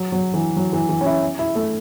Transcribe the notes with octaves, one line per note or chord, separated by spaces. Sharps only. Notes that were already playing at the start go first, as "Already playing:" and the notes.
Already playing: F#3
F#3
E3
F#3
E3
E3
C#4
E4
E4
A3